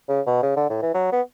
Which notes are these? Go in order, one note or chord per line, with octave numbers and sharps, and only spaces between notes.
C#3
B2
C#3
D3
A2
E3
F#3
B3